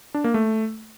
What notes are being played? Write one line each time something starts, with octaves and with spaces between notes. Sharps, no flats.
D4
A#3
A3